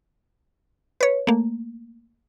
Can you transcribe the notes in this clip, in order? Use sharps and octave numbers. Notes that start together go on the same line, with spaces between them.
B4 C#5
A3 A#3